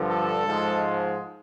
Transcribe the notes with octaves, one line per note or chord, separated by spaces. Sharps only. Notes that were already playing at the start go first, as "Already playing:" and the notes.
Already playing: G2 D3 F3
A4
G#2 F3 G#3